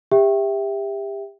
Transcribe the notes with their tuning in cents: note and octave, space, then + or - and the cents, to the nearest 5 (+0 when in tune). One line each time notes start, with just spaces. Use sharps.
G4 +30 E5 +0 G5 -10